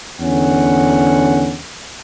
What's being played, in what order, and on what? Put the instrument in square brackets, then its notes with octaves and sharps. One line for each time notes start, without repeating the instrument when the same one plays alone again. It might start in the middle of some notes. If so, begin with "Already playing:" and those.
[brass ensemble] E2 D3 C#4 F#5